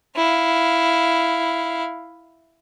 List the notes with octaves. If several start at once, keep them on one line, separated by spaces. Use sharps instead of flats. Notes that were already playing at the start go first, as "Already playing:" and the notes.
E4 F5